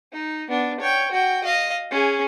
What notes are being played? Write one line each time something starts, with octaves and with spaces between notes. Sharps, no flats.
D#4
B3 D4
C#5 G5
F#4 G5
D#5 F5
C#4 G#4